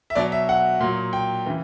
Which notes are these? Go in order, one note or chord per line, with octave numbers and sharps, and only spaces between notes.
E5
B2 F#3 D5
E5
F#5
A#2 F#3
G5
C#3 E3